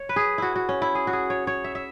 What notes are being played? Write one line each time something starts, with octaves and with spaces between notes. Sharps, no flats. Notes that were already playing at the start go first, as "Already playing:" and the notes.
Already playing: C#5
B4
G#4
E4 F#4
F#4
C#4
E4
G#4
F#4
G#4
C#5
C#5
E5
E5